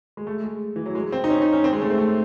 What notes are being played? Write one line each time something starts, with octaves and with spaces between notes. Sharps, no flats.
G#3
A3
G#3
E3
F#3
G#3
C4
D#4
C#4
D#4
C#4
C4
G#3
A3
C4
A3